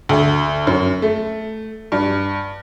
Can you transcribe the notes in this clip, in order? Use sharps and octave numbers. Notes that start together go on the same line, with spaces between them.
D2
F#2
A3
G2